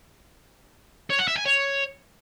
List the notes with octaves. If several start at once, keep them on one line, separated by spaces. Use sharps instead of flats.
C#5
F#5
E5
G#5
C#5